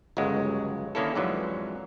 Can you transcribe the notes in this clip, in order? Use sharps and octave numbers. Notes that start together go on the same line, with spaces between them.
G1 C#2 F#2 F#3 G#3
D3 D#3 A#3 C#4 E4 A4
F2 G#2 D3 E3 F#3